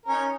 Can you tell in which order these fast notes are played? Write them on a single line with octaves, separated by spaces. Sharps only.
A#4 C#4 D#4